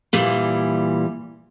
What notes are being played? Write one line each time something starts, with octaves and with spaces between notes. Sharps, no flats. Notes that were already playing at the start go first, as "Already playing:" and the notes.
A#2 E3 G3